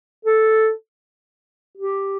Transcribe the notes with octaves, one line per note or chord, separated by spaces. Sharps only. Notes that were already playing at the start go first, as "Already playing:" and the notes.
A4
G4